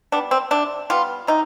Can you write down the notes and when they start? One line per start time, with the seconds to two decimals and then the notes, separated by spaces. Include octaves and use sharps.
0.12 G3 B3 D4
0.31 C4
0.51 C3 D4
0.90 G3 B3 F4
1.27 C3 D#4